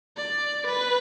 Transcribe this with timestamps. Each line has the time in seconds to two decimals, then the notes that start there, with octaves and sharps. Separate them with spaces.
0.17 D5
0.67 B4